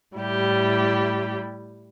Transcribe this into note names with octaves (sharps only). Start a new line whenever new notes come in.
A2 G3 E4 G4